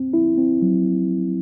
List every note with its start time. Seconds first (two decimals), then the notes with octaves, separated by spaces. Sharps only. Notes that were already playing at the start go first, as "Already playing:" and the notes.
Already playing: C4
0.14 E4
0.38 C4
0.62 F#3